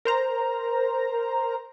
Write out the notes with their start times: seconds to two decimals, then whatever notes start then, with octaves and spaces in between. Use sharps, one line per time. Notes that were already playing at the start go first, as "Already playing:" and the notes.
0.05 A#4 C5 A#5